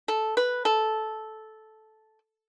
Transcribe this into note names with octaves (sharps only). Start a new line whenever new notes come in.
A4
B4
A4